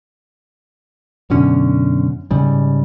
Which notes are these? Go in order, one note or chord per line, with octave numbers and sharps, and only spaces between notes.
F#2 B2 D3 C#4
G#2 C#3 G3